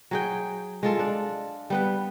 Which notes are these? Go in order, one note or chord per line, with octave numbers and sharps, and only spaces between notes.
F#3 G#4 G5
G#3 F4 A4
D4
G3 B3 B4